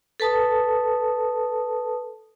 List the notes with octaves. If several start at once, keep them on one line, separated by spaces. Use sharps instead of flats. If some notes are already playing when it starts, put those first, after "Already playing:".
A4 B4 A5 D#6